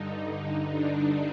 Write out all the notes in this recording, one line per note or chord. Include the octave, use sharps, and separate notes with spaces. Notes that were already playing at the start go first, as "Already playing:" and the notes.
Already playing: G2 D3 D#4
D4